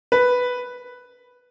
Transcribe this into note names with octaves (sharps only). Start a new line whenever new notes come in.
B4